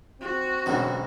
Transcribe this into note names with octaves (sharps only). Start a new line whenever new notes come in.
C4 F#4
E1 F#2 B2 D3 B3